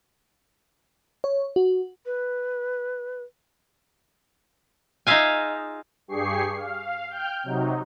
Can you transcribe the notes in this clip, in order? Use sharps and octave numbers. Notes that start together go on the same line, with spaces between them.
C#5
F#4
B4
D#4 F4 G#4 E5 F5 G#5
G2 G4 G#4 C#6 C7
F5
G5 F6 G6
C3 F#3 D#4